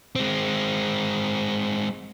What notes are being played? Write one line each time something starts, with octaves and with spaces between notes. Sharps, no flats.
G#3 C4